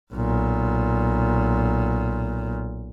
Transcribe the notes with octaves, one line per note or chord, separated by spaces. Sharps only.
B1 A#2